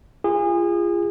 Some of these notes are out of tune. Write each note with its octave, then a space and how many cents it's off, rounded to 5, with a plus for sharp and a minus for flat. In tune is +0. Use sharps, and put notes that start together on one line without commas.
F4 -25 G#4 -30